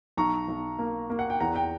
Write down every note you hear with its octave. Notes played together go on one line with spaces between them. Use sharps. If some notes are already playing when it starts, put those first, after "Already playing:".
B1 A#5 C#6
B1
A#3
A#3
F#5
G5
E2 F#5 A#5
G5